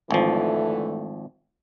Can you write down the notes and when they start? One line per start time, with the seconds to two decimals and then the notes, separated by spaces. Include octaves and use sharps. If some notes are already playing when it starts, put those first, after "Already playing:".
0.11 G#1 D3 E3 F3 A3